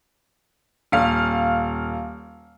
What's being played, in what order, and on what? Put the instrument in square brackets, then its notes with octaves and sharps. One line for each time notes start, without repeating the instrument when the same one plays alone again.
[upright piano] D#1 F5